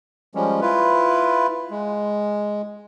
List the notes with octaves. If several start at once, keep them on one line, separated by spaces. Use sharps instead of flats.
F3 G3 G#3 C#4
E4 F4 B4
G#3